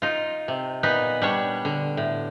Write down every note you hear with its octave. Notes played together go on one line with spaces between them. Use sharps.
D#4 F4
C3
A#2 B3 D#4 B4
G3 D4 C#5
D3
A2